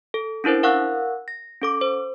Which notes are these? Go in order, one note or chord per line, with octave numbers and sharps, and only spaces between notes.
A4
C#4 D4 E4 A#4 C5
A#4 F5 F#5 C#6 E6 F#6
A#6
C#4 A4 D6
C5